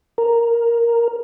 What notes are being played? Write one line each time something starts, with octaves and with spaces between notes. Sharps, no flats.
A#4